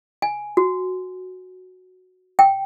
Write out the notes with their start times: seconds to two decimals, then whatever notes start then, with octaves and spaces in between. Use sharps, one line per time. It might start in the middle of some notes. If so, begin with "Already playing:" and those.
0.22 G#5
0.57 F#4
2.39 G5